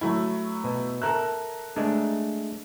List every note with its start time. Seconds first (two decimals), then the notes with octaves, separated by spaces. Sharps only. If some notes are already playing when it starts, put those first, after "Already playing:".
0.01 F#3 A3 E4
0.64 B2
1.02 A4 A#4 E5 A#5 F#6
1.76 G#3 A3 D4